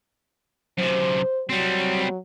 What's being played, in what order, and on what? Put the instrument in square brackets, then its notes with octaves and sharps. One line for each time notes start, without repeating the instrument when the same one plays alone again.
[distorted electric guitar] F#2 C3 [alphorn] C5
[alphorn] F#3 [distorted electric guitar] G3 C4